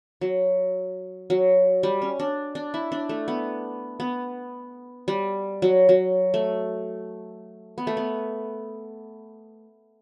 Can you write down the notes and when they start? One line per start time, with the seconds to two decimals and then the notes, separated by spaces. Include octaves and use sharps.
0.21 F#3
1.30 F#3
1.83 G3
2.02 C#4
2.20 D4
2.55 D4
2.74 E4
2.92 D4
3.09 A3
3.28 B3
4.00 B3
5.08 G3
5.62 F#3
5.89 F#3
6.34 A3
7.78 B3
7.87 A3
7.97 B3